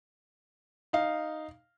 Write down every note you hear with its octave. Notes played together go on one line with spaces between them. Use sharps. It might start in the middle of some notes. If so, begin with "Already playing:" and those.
D#4 F5